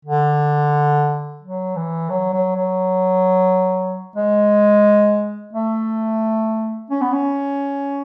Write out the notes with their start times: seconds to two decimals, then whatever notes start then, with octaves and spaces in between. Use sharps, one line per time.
0.05 D3
1.42 F#3
1.76 E3
2.10 F#3
2.33 F#3
2.55 F#3
4.16 G#3
5.53 A3
6.90 C#4
7.01 B3
7.13 C#4